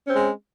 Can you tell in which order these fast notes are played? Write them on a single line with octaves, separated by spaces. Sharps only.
C#4 C4 G#3